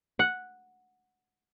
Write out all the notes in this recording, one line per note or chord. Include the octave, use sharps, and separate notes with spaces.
F#5